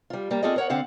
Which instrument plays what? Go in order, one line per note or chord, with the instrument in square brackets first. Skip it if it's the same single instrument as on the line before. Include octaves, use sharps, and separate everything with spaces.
[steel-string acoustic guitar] G3 F4
G3 A#3
C4 F4 G#4 A4 D5 D#5
A#4 C#5 F#5
D3 C4 F5 F#5